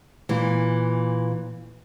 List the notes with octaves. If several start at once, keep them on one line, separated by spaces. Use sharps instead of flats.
A#2 E3